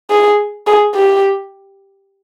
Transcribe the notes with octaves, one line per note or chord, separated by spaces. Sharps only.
G#4
G#4
G4